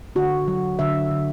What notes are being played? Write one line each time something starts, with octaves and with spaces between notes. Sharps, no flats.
D3 F#4
F#3
D3 E5
D3